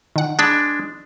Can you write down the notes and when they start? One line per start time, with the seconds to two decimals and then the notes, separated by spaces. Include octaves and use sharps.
0.16 D#3 F#5
0.39 G#3 D4 A5 B5